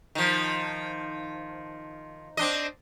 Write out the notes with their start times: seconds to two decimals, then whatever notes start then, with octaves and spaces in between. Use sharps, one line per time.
0.15 D#3 F3
2.37 C4 D4 D#5